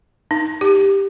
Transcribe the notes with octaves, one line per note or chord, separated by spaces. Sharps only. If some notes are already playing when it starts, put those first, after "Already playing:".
D#4
G4